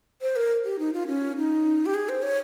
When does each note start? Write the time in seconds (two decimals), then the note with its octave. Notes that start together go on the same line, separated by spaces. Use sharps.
0.21 C5
0.36 A#4
0.65 G4
0.79 D#4
0.93 F4
1.07 C#4
1.37 D#4
1.86 G4
1.94 G#4
2.09 C5
2.22 C#5